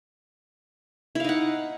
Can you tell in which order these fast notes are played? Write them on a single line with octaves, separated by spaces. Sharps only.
E4 F5 D#4 F#5